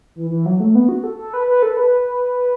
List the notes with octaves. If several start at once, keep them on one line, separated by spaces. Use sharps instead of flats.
E3
E3
F#3
A3
B3
F#4
A4
A4
B4
B4
A4
B4